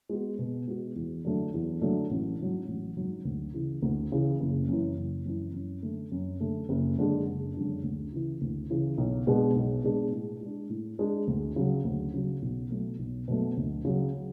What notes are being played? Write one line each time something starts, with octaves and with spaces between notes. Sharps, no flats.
G#3 B3 F#4
B2
G#3 B3 F#4
E2
D3 F#3 A3 D4
E2
D3 F#3 A3 D4
A1
G#2 F#3
A1
G#2 F#3
D2
C#3 E3
D2
C#3 E3
F#1
F#2 E3
F#1
F#2 E3
F#2
D3 A3
F#2
D3 A3
F#1
F#2 D3 G#3 D4
F#1
F#2 D3 G#3 D4
D2
C#3 E3
D2
C#3 E3
B1
B2 G#3 D4 G#4
B1
B2 G#3 D4 G#4
A2
G#3
D4
A2
G#3 D4
D2
C#3 F#3
D2
C#3 F#3
B1
B2 F#3 A3
B1
B2 F#3 A3
D2
C#3 F#3